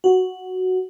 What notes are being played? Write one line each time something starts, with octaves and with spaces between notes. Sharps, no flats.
F#4